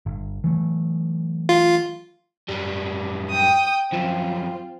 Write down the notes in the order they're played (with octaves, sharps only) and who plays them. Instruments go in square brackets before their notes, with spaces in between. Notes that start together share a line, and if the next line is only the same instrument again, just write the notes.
[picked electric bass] G1
E3 F#3 A3
[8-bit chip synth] F4
[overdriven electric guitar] F#2 G3
[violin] G5 D#6
[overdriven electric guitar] F#2 F3 [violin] C4 F4